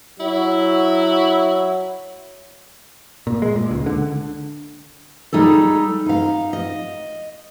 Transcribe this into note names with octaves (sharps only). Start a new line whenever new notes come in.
F#3 E4
A#2
G#3
A#2
C#2
D3
G3 D#4 G#4 A4
D#4 F5
D#5